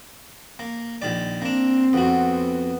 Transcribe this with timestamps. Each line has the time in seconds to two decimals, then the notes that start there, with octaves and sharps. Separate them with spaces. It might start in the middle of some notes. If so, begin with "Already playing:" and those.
0.59 A#3
1.02 A#1 D#3 D5
1.42 A#3 C4 D4
1.93 F2 B3 F#4 F#5